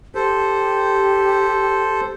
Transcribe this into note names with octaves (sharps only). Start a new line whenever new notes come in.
G4 A4 C5